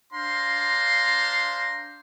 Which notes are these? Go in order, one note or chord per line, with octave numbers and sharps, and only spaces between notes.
D4 C5 F5 A#5 C6